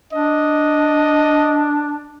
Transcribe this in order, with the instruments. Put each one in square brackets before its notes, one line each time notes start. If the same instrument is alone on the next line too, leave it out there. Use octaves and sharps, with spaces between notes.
[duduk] D4 [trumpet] D#5